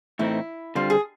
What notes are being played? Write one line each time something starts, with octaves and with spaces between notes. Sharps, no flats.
A2 E3 A3 C4 D#4 E4
D3 G3 C4 F4
G#4